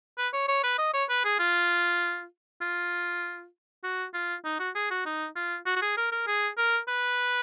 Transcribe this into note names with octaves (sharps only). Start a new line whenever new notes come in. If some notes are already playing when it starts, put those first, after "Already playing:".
B4
C#5
C#5
B4
D#5
C#5
B4
G#4
F4
F4
F#4
F4
D#4
F#4
G#4
F#4
D#4
F4
F#4
F#4
G#4
A#4
A#4
G#4
A#4
B4